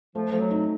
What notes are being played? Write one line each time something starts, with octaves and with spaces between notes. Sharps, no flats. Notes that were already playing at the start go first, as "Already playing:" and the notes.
F3 A3
F3 A3
F#3
D#4